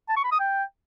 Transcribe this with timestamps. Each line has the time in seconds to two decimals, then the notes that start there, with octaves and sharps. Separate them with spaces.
0.09 A5
0.17 C#6
0.24 B5
0.32 D#6
0.40 G5